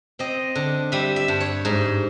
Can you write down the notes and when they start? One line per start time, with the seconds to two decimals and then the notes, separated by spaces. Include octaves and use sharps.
0.19 C4 D#5
0.55 D3
0.92 G3 E5
1.16 E5
1.28 G2
1.40 C#5
1.65 G#2